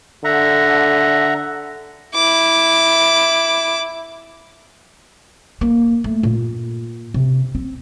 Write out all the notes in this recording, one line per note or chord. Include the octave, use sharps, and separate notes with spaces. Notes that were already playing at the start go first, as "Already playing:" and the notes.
D3 E5 F#5 A#5
E4 D6
A#3
A3
A#2
C3
C4